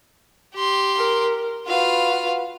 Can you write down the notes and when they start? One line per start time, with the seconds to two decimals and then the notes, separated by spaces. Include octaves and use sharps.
0.54 G4 C6
0.96 A#4
1.67 F4 F#4 B4 F5